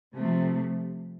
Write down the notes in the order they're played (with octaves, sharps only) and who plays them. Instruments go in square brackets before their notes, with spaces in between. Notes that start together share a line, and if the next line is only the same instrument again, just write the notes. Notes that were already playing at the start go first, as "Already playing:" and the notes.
[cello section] C3 F3 A3